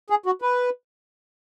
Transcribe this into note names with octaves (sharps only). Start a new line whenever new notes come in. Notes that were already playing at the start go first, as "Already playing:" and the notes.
G#4
F#4
B4